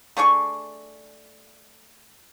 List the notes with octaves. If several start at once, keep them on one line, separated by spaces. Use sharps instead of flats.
A3 D4 G#4 C#6